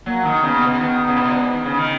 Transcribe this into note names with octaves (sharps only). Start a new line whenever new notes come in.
F#3 A#3
D#3
C#3 B3
B2
D#3
C#3
B2
A#2
G#2
D#3
C#3
D#3